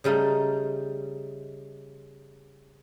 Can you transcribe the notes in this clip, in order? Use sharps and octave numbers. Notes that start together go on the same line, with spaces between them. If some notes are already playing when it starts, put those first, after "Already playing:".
C#3 G3 A3 D#4